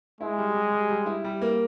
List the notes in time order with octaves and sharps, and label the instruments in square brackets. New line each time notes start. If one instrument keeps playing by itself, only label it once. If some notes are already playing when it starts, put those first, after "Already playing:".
[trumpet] G#3 [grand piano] E4
[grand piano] G3
G3
G3
G3
E4
G3
A#3